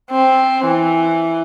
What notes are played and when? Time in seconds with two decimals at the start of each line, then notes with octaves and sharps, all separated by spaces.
0.11 C4
0.65 E3